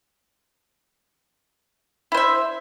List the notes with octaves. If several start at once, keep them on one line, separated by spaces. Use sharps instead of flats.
E4 C5 E5